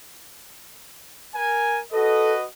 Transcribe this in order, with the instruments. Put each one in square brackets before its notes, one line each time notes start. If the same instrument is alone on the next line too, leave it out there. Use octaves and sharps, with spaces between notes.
[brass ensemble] A#4 G#5
[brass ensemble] F#4 B4 D#5 [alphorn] A4